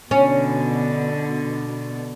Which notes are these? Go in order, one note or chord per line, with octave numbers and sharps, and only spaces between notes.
B2 D3 C#4